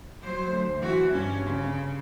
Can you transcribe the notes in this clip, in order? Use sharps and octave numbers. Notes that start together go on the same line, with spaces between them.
F#3 C5
D2
E3 F#4
G2 C#4
C#3